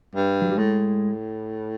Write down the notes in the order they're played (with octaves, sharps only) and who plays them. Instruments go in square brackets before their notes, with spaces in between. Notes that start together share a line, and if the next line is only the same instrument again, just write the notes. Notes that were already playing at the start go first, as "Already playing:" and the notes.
[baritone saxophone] G2
[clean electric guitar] F#3
G3
[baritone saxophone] A2 [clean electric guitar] G#3